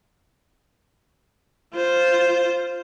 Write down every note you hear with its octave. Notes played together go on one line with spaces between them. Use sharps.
F4 C5